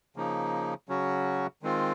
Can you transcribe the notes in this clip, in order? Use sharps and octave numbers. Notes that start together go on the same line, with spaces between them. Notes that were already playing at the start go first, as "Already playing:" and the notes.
C#3 F3 A#3 D#4
C#3 F#3 C#4 F#4
D#3 G#3 C4 F4